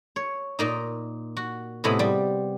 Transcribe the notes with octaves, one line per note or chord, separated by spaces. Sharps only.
C#5
A#2 A#3 D#4
F#4
A2 C3 G#3 B3 B5
G3